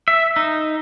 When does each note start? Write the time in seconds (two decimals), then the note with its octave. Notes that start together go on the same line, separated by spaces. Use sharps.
0.08 E5
0.36 D#4